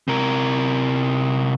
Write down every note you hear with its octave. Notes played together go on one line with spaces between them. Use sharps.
C3 A#4